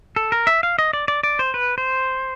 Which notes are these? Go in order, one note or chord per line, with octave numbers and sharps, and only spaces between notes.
A4
A#4
E5
F5
D#5
D5
D5
D5
C5
B4
C5